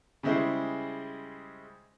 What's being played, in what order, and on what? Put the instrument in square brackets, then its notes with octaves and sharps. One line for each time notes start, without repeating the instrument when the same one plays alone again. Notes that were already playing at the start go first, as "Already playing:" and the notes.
[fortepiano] C#3 G3 G#3 E4 C5